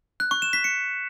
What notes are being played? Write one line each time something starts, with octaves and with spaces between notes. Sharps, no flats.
F#6
C#6
E7
B6
C#7